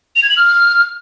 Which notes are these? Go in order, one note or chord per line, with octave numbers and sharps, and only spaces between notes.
F7
G#6
F#7
F6